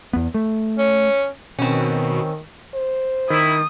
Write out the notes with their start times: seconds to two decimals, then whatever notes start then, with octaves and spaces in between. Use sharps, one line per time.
0.13 E2 B3
0.34 A3
0.78 C#4
1.59 B2 D#3 C4 C#4
2.74 C5
3.30 D#3 E4 D#6